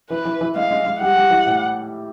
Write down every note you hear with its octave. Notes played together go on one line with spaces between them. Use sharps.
E3 B4
E3
E3
G#3 F5
G#3
G#3
G3 F#5
G3
E3
A2